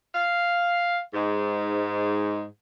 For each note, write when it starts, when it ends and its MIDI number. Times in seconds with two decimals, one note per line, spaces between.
0.14 0.98 77
1.14 2.42 44